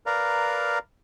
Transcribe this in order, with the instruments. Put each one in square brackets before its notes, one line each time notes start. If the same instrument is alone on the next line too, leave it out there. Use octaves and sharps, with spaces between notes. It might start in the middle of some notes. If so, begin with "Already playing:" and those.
[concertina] A#4 B4 D5 F5 A#5